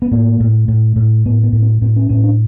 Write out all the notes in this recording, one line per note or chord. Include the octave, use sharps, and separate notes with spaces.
B3
A2 A#3
A2
A2
A2
A2 B3
B3
A2
C4
A2 C4
C#4
A2 C#4
D4